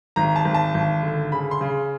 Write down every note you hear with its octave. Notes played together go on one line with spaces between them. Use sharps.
G#1 A#5
A5
G#1
A5
G#1
D3
C#3 B5
C6
C#3